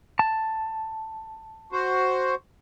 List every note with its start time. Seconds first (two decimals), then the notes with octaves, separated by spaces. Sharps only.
0.19 A5
1.72 F#4 C5